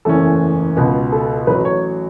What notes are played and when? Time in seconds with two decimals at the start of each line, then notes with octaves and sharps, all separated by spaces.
0.05 F#1 E2 E3 A3 C#4 A4
0.76 C#2 B2 B3 F#4
1.12 A4
1.47 A1 A2 F#3 B4
1.65 C#5